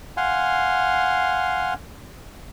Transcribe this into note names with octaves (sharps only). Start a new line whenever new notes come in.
F5 F#5 G#5 C6